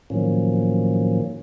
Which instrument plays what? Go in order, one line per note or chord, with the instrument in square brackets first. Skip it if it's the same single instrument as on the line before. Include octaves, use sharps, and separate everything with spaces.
[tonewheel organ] A2 D#3 F3 F#3 A#3 C#4